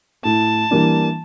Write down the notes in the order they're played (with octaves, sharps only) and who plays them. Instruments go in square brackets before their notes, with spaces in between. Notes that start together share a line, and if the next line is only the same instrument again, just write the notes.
[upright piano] A2 [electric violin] A5
[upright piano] E3 G3 A#3 D4